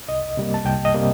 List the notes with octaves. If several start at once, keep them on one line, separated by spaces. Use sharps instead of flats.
C2 D#5
C3 G3 A#3
A5
C2 G5
D#5
C3 G3 A#3